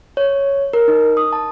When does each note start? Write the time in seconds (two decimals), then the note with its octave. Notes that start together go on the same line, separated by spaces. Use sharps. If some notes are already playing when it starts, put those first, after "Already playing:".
0.17 C#5
0.73 A#4
0.88 D#4
1.17 D#6
1.33 A5